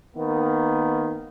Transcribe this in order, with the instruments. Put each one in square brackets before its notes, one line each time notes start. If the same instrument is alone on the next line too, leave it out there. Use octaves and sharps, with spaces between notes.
[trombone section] D#3 A#3 B3